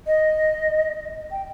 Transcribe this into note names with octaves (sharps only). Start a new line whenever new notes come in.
D#5
G5